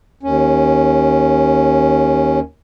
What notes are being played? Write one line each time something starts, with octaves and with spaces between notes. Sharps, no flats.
D#2 C#4